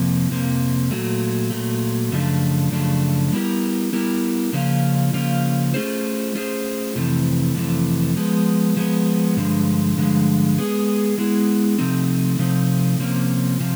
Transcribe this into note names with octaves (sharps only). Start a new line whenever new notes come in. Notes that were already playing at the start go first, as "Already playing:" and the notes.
Already playing: F2 C3 F3 A#3
F2 C3 F3 A#3
A#2 F#3 A3
A#2 F#3 A3
F#2 C#3 F3 A3 D4
F#2 C#3 F3 A3 D4
G3 B3 E4 G4 A#4
G3 B3 E4 G4 A#4
C#3 F3 A#3 C#4 F4
C#3 F3 A#3 C#4 F4
A3 C#4 F4 G#4 C5
A3 C#4 F4 G#4 C5
F2 C3 E3 A3
F2 C3 E3 A3
F3 G#3 B3
F3 G#3 B3
G2 D3 F3 G#3
G2 D3 F3 G#3
G#3 B3 E4 G#4
G#3 B3 E4 G#4
C3 F3 A3 C4 D#4
C3 F3 A3 C4 D#4
C3 F3 A#3 C#4
C3 F3